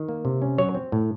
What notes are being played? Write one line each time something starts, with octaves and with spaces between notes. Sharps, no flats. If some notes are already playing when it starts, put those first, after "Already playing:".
Already playing: D#3
A#3
C3
C#4
F#3 C#5
C4
A2